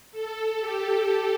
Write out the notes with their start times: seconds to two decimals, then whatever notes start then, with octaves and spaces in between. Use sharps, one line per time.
0.12 A4
0.60 G4